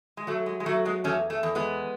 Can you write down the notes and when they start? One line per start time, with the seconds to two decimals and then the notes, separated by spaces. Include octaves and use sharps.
0.17 G#3
0.27 F#3 A3
0.46 G#3
0.60 G#3
0.66 F#3 A3
0.85 G#3 B3
1.04 E2 A3 C#4
1.30 A3
1.43 E2
1.55 G#3 B3